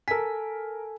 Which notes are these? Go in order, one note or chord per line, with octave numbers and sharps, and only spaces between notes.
A4 A#4 G#5 B6